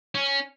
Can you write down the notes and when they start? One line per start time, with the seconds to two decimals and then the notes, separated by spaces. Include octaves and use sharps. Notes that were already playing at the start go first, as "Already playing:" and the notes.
0.15 C#4